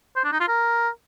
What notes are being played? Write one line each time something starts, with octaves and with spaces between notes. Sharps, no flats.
C5
D4
D#4
F4
A#4